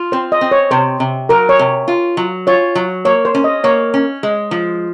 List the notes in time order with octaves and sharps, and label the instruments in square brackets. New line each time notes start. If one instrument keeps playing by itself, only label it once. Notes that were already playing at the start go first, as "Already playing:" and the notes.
Already playing: [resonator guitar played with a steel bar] F4
[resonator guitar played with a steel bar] C4 [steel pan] C5
[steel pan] D#5
[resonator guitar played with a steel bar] C4
[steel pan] C#5
[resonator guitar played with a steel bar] C3 [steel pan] C5
[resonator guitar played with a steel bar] C3
[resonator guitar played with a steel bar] F#3 [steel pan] A#4
[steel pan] C#5
[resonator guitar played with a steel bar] C3
F4
F#3
[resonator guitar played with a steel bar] F4 [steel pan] C#5
[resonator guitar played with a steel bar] F#3
[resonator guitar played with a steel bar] A#3 [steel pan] C#5
[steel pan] C5
[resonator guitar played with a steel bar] C#4
[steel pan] D#5
[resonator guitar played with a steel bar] A#3 [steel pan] C#5
[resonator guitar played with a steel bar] C#4
G#3
F3